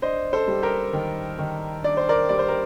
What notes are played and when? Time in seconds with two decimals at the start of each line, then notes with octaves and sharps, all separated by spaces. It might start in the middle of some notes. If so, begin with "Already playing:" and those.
0.02 D4 C5 D#5
0.33 A4 C5
0.48 G3
0.63 G4 A#4
0.93 D#3
1.39 D#3
1.84 D4 D5
1.97 C5
2.09 A#4 D5
2.29 G3 D5
2.39 C5
2.49 A#4